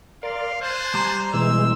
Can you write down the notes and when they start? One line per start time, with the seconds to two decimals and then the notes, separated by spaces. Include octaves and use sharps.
0.23 A#4 D5 F5 C6
0.61 C5 G#5 A5 F#6
0.94 G3 A#5 C6
1.34 B2 E3 G#3 E6